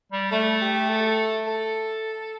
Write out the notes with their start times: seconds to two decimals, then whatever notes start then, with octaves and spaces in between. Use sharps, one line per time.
0.12 G3
0.31 A3 A4
0.61 G4
0.89 A4
1.47 A4